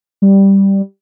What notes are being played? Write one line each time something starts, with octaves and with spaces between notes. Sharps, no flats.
G3